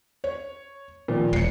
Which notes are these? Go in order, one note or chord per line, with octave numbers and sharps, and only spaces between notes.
C#5
A#2 D#3 F3
E1 C7 C#7